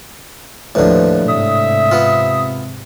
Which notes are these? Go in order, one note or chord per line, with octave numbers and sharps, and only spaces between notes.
D#2 A2 D3 F3 B4
G#2 C3 E5 D#6
B3 F4